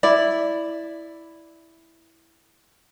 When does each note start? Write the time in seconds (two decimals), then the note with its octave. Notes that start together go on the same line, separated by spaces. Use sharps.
0.03 E4 D5